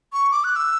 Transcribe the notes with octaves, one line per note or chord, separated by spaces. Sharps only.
C#6
D6
F#6
E6